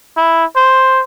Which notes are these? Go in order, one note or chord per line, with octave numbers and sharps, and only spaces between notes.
E4
C5